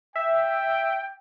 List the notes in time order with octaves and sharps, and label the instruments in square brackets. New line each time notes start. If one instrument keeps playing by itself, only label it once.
[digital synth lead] E5 [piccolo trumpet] G5